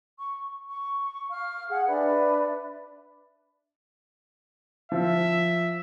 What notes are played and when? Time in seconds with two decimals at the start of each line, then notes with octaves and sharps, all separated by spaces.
0.17 C#6
0.68 C#6
1.30 F5 F6
1.70 G#4 F#5
1.87 D4 B4 D5 E5
4.92 F3 E5